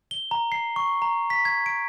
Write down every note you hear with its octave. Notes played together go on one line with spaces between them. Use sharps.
G7
A#5
C7
C#6
A#5
B6
G#6
D7